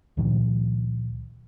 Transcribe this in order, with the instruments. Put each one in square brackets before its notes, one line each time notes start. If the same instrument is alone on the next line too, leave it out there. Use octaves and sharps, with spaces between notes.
[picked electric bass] C#2 A#2 D#3 F3